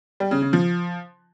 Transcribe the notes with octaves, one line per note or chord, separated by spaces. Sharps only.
G3
C#3
C#3
F3